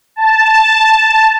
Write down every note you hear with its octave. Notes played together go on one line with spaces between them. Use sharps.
A5